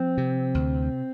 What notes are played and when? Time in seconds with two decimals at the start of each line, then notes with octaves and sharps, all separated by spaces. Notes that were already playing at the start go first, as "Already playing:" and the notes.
Already playing: F3 C4
0.18 C3
0.55 D2